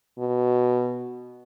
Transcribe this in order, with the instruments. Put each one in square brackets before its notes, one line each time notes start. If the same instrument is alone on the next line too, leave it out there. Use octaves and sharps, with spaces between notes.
[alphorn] B2